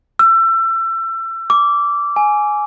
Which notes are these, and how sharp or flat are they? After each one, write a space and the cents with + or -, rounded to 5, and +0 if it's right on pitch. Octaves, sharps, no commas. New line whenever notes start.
E6 +30
D6 -15
G#5 +10